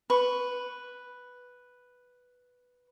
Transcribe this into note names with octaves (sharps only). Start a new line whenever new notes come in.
B4 C#6